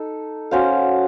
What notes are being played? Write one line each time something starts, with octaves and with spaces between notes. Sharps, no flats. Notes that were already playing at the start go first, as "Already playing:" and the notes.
Already playing: D#4 A4
C#4 F#4 C5 F5